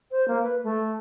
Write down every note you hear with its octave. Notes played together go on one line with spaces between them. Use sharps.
C5
A#3
B4
A3